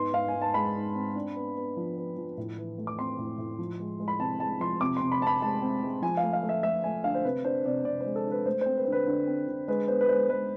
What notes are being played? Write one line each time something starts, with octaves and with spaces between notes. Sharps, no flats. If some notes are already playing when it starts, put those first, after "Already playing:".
Already playing: G#2 B3 C6
G#2 F5
G#5
G#2
A5
G#3 B5
G#2
C4
D4
B3
B3
F3
B3
F3
A2
E3
A3
D6
C4 C6
A2
A2
F3
G#3
G#3
B5
C3 A5
G#3 A5
F3 C6
C3 D6
C3 C6
B5
C4 A5
B5
G#3 A5
C4
G#3
F3 G#5
F5
A3
F5
A3
E5
A3 E5
A3 G#5
D3 F5
C5
C3 B4
D4 C5
C3 D5
C3 D5
G#3 C5
A4
D4 B4
A3 C5
C4 C5
B4
C5
D3 B4
D3
C4
D3
G#3 B4
B3 C5
B4
G#3 C5
G#3 B4